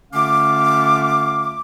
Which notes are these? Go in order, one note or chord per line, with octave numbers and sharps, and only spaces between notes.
D3 A3 C#4 F4 F5 D6